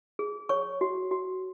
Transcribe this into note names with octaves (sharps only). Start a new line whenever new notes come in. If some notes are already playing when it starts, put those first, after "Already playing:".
G#4
C#5 C#6
F#4
F#4